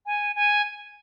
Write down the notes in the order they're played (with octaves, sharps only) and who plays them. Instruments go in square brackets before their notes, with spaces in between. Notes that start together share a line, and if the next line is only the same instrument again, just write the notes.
[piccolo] G#5
G#5